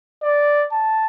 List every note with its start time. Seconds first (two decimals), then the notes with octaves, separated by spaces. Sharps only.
0.23 D5
0.72 A5